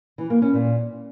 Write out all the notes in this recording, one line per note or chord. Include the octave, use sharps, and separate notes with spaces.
E3
A#3
C#4
A#2